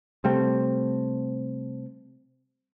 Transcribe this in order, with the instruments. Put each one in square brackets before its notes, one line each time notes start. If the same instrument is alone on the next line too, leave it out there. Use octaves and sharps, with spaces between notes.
[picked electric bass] C3 G3 A3 C4